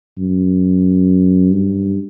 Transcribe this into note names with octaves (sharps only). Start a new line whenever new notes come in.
F#2
G2